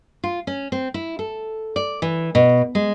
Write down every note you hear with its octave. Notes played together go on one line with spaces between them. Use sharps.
F4
C#4
C4
E4
A4
D5
E3
B2
G#3